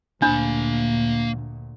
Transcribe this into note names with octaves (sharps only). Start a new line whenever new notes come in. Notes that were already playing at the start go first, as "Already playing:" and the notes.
D2 A#2 A#3 D4 B5